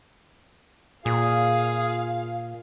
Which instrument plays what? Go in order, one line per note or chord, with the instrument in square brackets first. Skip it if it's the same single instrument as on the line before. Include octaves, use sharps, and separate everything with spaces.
[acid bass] A#2 [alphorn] F4 [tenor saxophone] G#4 [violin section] F5